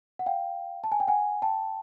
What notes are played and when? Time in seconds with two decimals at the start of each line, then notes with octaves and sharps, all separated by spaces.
0.19 F#5
0.26 F5 G5
0.84 A5
0.92 G#5
1.00 G5
1.08 F#5 G#5
1.42 G5 A5